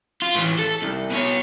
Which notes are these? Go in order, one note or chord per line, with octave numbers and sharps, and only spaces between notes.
F4
A2 E3
A4
C2
B2 C#5